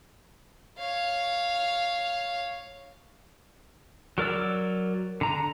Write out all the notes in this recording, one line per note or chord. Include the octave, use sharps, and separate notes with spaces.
C#5 F5
F#3 A#4 D5 E6
D3 A#5